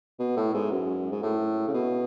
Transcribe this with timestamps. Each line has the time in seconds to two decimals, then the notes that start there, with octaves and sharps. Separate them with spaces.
0.19 B2
0.36 A2
0.54 G#2
0.71 F#2
1.11 G#2
1.22 A2
1.67 C#3
1.74 B2